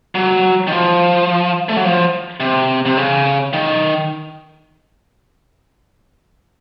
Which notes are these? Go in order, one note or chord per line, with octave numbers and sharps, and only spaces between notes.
F#3
D#3
F3
A3
F#3
F3
C3
C3
C#3
D#3